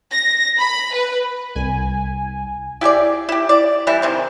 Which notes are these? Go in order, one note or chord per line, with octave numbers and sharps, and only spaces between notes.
A#6
B5
B4
C2 G#5
E4 G4 G#4 D5
E4 G4
D5
E3 G3 E4
C3 D#3 C4